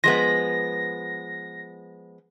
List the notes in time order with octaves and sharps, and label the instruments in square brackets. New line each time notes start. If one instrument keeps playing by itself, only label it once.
[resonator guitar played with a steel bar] F3 G#3 B3 [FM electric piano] A#6